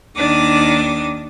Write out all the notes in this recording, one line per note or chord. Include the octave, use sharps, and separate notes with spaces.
D#2 D#3 D4 D6 D#6